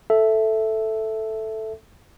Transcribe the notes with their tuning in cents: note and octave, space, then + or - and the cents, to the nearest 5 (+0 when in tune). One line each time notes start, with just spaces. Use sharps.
A4 +0 E5 +0